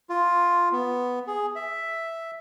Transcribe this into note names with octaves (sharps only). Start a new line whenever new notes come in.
F4
B3
G#4
E5